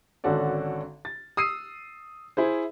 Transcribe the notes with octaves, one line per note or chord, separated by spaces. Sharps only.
G#1 D3 C#4 F#4 A4 D5
A6
D#6 E6 C7 D#7
E4 G#4 C5